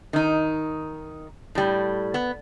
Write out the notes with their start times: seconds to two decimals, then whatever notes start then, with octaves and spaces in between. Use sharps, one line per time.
0.13 D#3 D#4
1.55 A2 G3
2.14 B3